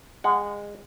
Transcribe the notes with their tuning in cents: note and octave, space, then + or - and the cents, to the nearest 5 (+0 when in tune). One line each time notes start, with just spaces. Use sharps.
G#3 -20 F#5 +0